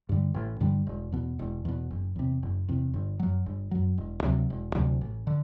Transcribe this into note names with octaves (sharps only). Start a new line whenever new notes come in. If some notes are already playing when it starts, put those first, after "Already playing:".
G2 D3 G3
A1
G2 D3 G3
E1
E2 B2
E1
E2 B2
F#1
E2 C3
F#1
E2 C3
G1
F#2 F#3
G1
F#2 F#3
E1
D2 C3 F#3
E1
D2 C3 F#3
A1
D3